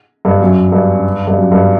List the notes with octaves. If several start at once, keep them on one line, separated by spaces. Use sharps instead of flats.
G2
F#2
G2
G2
F#2
G2